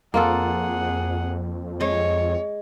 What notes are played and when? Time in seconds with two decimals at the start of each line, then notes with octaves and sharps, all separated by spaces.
0.14 F2 A#3 F4 G#4 A4 F#5
1.80 G#3 C#5